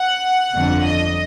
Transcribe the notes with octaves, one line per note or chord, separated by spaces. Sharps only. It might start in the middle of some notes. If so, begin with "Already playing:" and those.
Already playing: F#5
G1 F2 D3
D#5